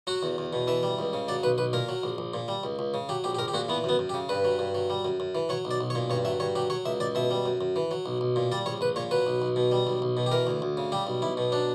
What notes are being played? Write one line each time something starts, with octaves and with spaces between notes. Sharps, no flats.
F#3 F#4
E2
E2
B2
E3 E5
G3
C#2
C#3
F#3 D5
B1 B4
B1 B4
A#2 A#4
F#3
A#1
A#1
A#2
G3
C#2
C#2
C#3
F#3 G4
A#1 G4
G4
A#1 A#4
G4
A#2 F#4
E3 B3
F#2 B3
F#2
G4
C#3
G2 B4
F#3
G2
F#3
G3
F#2
F#2
E3
F#3 C#5
B1
D5
B1
C#5
A#2
G2 C#5
F#3 E5
G2 C#5
F#3 G4
F#3 C#5
C#2 E5
C#2 D5
B2 E5
G3
F#2
F#2
E3
F#3
B1
B1
A#2
G3 D5
A#1 C#5
A#1 B4
A#2 C#5
F#3 B4
B1
B1
B2
G3
B1
B1
B2
G4
E3 A#4
D2
D2
C#3
G3 G4
B1
B1 E4
B2
F#3 D4